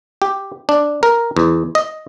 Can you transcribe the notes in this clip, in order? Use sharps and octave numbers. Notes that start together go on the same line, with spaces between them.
G4
D4
A#4
E2
D#5